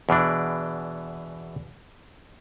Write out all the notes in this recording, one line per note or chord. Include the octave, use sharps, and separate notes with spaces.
E2 B2 E3 D4